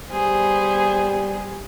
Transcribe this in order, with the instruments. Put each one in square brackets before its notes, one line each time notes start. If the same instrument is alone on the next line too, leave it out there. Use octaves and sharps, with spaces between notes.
[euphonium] G3 [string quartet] B3 G#4 C5